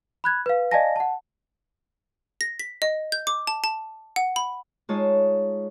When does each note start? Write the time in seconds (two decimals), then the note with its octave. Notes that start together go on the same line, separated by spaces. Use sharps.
0.24 B5 F#6 G#6
0.46 B4 F5
0.71 D5 D#5 F5 G#5 A5 A#6
0.96 F#5 A5
2.41 A#6
2.59 B6
2.82 D#5
3.12 G6
3.27 D6
3.47 A5
3.64 A5
4.16 F#5
4.36 B5
4.89 G#3 D#4 F4 C#5 A5 D#6